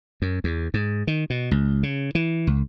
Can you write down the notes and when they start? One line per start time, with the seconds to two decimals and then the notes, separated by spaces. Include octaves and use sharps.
0.22 F#2
0.44 E2
0.74 G#2
1.07 D#3
1.30 B2
1.51 C#2
1.83 C#3
2.15 E3
2.47 C#2